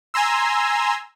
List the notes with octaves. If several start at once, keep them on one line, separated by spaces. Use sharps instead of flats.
G#5 A#5 C6 E6